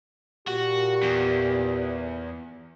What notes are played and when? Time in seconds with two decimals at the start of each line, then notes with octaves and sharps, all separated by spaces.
0.47 A#2 F#4 G4
1.03 E2